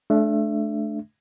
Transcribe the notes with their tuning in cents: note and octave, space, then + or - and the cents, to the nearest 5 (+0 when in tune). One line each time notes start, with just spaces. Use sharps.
A3 -30 D4 +0 E5 +20